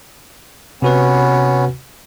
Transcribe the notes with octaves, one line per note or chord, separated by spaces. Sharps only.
C3 B3 C#4 F#4 B4